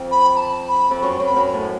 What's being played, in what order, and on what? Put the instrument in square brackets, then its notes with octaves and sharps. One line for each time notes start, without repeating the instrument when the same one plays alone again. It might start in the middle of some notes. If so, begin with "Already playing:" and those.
Already playing: [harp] F2
[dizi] B5
B5
A5
B5
[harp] F2
[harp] F#2 [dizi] C#6
[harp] F#2
[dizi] B5
[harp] F#2
[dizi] C#5
[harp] A2